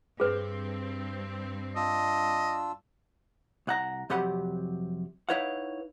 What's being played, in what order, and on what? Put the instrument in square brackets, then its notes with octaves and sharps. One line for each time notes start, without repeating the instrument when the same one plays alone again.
[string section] G2 C4 [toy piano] G#4 B4
[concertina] D4 F4 E6 [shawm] D#5
[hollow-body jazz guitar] C2 F#5 A#5
F2 C3 F#3 G4 F#5 B5
D#4 E4 B4 C#5 F5 F#5